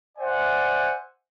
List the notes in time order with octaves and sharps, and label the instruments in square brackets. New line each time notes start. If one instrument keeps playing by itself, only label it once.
[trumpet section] C5 D5 E5 F#5 G#5